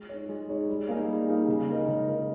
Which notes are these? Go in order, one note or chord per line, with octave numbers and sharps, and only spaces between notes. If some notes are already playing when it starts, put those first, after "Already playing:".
Already playing: G#3
D#4 G#4 C#5
G#3
D#4 G#4 C#5
G3
A#3 D#4 G#4
G3
A#3 D#4 G#4
C#3
G#3 D#4 A#4 D#5
C#3
G#3 D#4 A#4 D#5